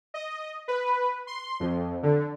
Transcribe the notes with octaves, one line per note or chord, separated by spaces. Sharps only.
D#5
B4
C6
F2
D3